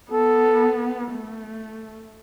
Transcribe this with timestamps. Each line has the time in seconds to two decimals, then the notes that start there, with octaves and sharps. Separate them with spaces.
0.11 B3 A4
1.12 A3